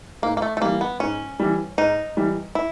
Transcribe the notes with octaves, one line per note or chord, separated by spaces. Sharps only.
G#2 A#3
A#3
A3
A3
E3 G3 A#3
B3
G#2 C#4
E3 G3
G#2 D#4
E3 G3
E4